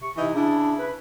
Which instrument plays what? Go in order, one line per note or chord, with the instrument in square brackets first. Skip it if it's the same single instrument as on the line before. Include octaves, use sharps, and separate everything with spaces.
[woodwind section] C3 C#6
[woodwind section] C3 [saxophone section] E3 D#4 E4
[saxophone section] C#3 E4 [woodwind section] D4
[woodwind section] B4